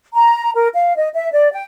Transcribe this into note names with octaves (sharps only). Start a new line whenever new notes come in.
A#5
A#4
F5
D#5
E5
D5
G5